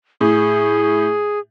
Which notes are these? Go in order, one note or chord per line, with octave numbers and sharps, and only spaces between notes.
A2 G#4